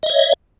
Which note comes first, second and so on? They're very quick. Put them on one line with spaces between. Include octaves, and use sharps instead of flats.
D#5 E5 C#5